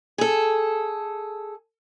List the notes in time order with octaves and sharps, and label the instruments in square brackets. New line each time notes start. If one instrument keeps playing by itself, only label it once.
[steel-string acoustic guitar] G#4 A4